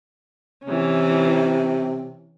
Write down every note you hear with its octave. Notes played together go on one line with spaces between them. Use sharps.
C3 E3 C#4